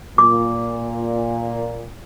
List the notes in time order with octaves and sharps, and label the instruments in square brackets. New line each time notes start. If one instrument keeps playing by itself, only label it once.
[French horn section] A#2 [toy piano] D6